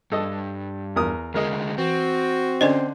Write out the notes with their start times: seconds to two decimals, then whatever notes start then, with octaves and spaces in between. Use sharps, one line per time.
0.12 G2 A4 D#5
0.96 E2 A#4 D#6
1.34 D2 G#3 A#4 D#5
1.78 E3 C4 F#4
2.61 D3 C#4 C5 D5 D#5